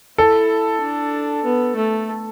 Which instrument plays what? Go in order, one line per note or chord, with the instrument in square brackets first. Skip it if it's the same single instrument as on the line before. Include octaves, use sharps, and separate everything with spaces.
[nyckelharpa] E4 [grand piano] A4
[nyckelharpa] D4
B3
A3